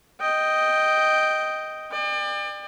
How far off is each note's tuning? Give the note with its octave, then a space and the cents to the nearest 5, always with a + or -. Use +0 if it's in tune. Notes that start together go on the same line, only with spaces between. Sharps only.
D#5 +0 G5 +0
D5 +35 G5 +35